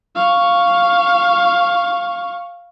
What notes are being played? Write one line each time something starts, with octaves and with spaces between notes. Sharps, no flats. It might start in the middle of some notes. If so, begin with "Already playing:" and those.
F5 C#6